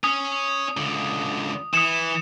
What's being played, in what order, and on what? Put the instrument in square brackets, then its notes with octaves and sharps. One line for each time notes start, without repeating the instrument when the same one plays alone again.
[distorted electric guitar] C#4 [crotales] D#6
[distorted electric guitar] C#2 D3
[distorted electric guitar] E3 [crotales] D#6 C#7 E7